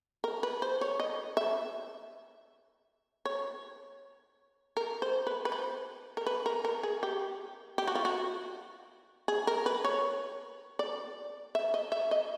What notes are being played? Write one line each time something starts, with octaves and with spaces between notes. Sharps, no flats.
A#4
B4
C5
C#5
D#5
E5
C#5
A#4
C5
B4
B4
C5
A#4
B4
A#4
A#4
G#4
G4
G4
F#4
F4
F#4
G#4
A#4
B4
C#5
D5
E5
D#5
E5
D#5